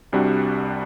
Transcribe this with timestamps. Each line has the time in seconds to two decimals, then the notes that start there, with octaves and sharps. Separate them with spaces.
0.13 C2 C3 G3 D4 F#4